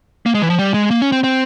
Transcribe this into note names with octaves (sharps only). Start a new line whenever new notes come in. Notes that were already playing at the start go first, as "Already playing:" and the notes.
A#3
G#3
E3
F3
G3
G#3
A#3
C#4
C4
C4